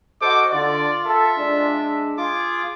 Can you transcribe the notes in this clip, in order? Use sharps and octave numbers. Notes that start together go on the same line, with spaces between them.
F#4 A4 C5 D#5 D6
D3 F4 D5
A4 E5
G#3 D4
F4 G#4 D6